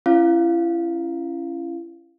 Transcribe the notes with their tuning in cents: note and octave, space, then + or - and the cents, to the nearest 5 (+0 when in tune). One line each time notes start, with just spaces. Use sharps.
C#4 -10 E4 +40 F5 +0